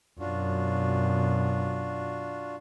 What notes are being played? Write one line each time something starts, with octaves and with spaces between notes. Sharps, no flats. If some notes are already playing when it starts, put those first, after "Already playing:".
F#2 B2 D4 F4 F#4